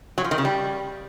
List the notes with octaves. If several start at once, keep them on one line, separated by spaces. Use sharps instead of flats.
F#3
F3
D#3
C#3
G3